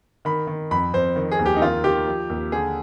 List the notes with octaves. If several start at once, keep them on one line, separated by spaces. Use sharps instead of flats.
D#3 B5
D#3
F2 B5
F2 C5
D#3
G#4
D#2
G4
D#4
D#3 F4
D#3 G4
F3
D#2
D3 G#4